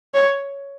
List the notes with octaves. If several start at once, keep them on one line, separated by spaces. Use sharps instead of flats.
C#5